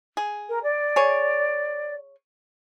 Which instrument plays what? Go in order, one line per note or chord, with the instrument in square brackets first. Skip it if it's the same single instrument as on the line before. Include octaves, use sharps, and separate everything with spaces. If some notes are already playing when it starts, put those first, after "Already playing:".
[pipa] G#4
[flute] A#4
D5
[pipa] G#4 C#5